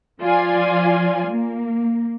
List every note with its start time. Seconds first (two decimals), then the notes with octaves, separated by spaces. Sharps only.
0.20 F3 F4 D5 G#5
1.29 A#3